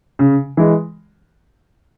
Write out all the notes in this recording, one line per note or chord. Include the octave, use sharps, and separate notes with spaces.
C#3
E3 G#3